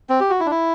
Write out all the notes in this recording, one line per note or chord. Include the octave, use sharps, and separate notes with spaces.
C4
G4
F#4
E4
D4
E4